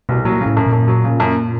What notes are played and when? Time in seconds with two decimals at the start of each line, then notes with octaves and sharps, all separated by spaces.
0.09 C2 B2
0.25 A#2 F#3
0.41 C#3
0.46 A2
0.57 F#2
0.66 A#2
0.72 F#2
0.88 F#3
1.04 C#3
1.20 F#2